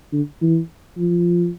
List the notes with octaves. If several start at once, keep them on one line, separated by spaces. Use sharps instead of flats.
D3
E3
F3